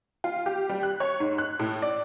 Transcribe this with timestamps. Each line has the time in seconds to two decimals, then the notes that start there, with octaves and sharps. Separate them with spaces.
0.24 F4
0.46 G4
0.69 G3
0.83 F#6
1.00 C#5
1.20 G#2
1.38 F#6
1.59 A2
1.82 D5